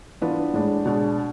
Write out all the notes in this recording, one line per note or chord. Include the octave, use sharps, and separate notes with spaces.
E3 B3 D4 F4 B4
A2 G#3 D4
B2 G#3 D4